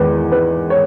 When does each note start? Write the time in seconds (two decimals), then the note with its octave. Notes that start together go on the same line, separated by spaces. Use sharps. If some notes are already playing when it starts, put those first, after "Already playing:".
Already playing: E2 D#3 G#3 B4
0.32 B4
0.70 C#5